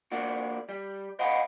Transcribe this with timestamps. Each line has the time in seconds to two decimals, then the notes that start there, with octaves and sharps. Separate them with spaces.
0.12 A#3 D4 F#4
0.69 G3
1.19 C5 D#5 F5 F#5 G#5 B5